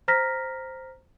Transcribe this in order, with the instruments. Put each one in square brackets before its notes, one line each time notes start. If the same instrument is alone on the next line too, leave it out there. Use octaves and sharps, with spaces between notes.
[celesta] C5 A#5 F6 A#6 B6